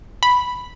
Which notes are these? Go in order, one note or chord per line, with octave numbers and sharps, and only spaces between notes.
B5